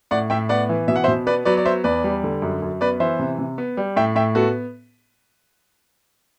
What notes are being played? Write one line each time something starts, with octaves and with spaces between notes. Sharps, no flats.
A2 D5 F#5
A2 E5 G5
B3 D5 F#5
E3
B2 E5
F#5
C5 E5
B2
B3 B4 D5
F#3 B4 D5
D5
B3 C5 E5
E2 B4 D5
G3
D3
F#2
F#2
B3 B4 D5
E3 C5 E5
C3
C3
B3
G3
A2 E5 G5
A2 E5 G5
B3 F#4 A4